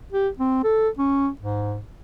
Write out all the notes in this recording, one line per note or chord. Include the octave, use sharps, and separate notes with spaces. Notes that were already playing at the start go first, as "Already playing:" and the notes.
G4
C4
A4
C#4
G#2